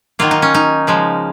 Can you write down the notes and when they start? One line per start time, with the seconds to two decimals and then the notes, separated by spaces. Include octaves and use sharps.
0.19 D#3 F#3 A#3 F4
0.31 D#4
0.42 C#4
0.54 D#4
0.87 C#3 F3 G#3